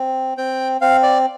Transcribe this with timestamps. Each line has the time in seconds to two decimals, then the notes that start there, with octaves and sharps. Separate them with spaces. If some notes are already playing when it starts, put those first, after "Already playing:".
Already playing: C4
0.38 C4 G5
0.81 C4 F5
1.03 D5